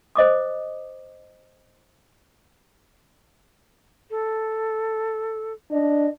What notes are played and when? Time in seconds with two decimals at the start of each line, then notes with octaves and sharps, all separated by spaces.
0.16 C5 D#5 D6 D#6
4.10 A4
5.71 D4 D#5